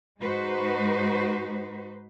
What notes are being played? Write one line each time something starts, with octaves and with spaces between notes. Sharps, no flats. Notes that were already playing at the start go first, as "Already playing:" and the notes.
G#2 G#3 D#4 F#4 B4 C5